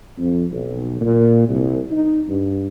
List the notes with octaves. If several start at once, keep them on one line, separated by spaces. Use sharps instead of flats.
F2
B1
A#2
C2
D#4
G2